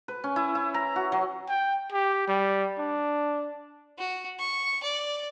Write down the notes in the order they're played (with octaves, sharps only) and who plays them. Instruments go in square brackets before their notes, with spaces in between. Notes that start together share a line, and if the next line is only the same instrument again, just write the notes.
[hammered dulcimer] B4
C#4
E4
E4
A#5
F#4
F#3
[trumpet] G5
G4
G3
D4
[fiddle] F#4
C#6
D5